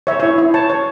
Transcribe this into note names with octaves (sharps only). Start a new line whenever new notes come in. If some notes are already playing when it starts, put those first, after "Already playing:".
C#5 E5
E4 C#5
E4
C#5 A5
C#5